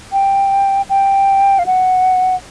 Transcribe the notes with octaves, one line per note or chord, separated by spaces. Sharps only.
G5
G5
F5
F#5